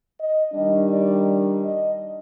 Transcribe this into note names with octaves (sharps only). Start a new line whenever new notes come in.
D#5
D#3 G3 D4 D#5
D5
D#5